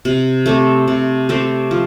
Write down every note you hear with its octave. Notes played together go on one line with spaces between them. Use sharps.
C3
A3 C4 G4
C3
A3 C4 G4
F3